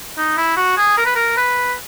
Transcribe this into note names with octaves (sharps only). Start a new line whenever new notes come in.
D#4
E4
F#4
G#4
A#4
B4
A#4
B4